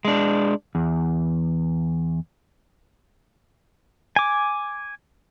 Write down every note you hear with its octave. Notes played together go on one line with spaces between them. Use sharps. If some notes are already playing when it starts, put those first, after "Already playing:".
G#3 D4
E2
G#5 D6